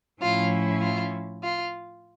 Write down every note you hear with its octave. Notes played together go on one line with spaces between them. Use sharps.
A2 F3 C#4 E4 F4
F4
F4